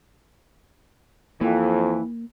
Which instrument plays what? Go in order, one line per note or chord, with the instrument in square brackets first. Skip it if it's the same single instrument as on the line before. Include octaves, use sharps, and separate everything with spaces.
[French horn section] F2 [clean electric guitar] E3 [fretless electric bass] A#3